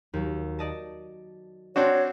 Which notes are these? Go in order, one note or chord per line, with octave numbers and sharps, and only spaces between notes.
D#2 F#3
D5 D#5 A5
C4 D4 F#4 C#5